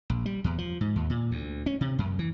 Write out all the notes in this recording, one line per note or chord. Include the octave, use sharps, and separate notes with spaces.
A#1
G3
E2
F3
G#2
D#2
A#2
D2
C#4
C3
F#2
E3